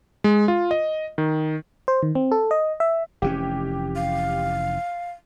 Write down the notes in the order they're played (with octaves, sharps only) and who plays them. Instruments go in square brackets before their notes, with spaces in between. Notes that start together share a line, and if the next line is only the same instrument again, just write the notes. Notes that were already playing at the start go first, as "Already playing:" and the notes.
[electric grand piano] G#3
F4
D#5
D#3
[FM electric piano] C5
D#3
C4
A4
D#5
E5
[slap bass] F1 E3 C#4 [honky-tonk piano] G4
[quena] F5